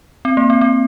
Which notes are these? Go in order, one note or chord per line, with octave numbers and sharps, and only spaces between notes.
C4
A#3
C4
C4